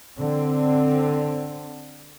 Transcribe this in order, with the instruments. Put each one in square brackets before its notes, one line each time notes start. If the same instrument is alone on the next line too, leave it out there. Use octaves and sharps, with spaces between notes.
[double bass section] D3 C4